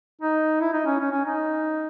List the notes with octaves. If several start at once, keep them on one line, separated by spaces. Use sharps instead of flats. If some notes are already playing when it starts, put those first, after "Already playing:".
D#4
E4
D#4
C#4
C#4
C#4
D#4